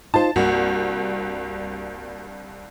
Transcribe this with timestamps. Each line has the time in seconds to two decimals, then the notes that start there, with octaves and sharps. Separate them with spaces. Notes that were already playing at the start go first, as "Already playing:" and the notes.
0.14 D#4 F4 C5 A5
0.36 C2 G2 A#3 F#4